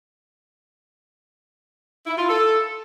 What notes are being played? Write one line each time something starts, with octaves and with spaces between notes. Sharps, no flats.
E4
F4
A4